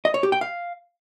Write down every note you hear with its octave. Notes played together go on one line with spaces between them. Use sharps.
D#5
C#5
G4
G5
F5